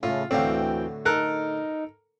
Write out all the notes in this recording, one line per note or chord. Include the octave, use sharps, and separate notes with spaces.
A2 C#3 A3 C#4 F4
D2 A2 D3 E3 F#3 C4 F5 G5
D#4 A4 A#4 F#6